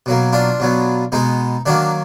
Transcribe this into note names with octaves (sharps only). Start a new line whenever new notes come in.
B2 F#3 A#3
D4 F4
B2 F#3 B3
B2 G#3 B3 D#4
D#3 F#3 A#3 D4